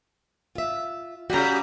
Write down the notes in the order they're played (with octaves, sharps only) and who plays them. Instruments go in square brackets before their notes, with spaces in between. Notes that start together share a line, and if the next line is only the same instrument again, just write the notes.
[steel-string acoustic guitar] F4 E5
[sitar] C#3 G3 [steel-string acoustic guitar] F#4 A#5